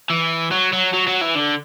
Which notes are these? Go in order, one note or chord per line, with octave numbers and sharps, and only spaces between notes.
E3
F#3
F#3
F#3
F#3
E3
D3